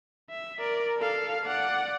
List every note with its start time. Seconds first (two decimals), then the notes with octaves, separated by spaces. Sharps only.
0.31 E5
0.59 A#4 D5
0.98 A4 F5
1.46 D5 F#5